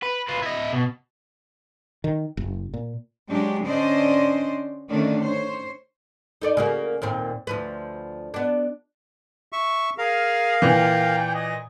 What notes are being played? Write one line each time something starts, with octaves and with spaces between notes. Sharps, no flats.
B4
F4 B4
E4 D#5
B2
D#3
F#1
A#2
F#3 G#3 D4 G4
D3 C#4 D4 C5 D5 D#5
D3 D#3 A3 C#4 D4
C5 C#5
D#4 A4 D5
C#3 A#3 F#4
D#2 A#2 C4
D2 F3 B4
B3 D4
E5 C#6
G#4 A#4 F5
A#2 E3 G5
D#5